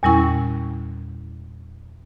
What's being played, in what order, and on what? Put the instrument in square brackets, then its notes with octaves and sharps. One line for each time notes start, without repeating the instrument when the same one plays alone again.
[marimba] E2 A#2 G3 C#4 E4 C#6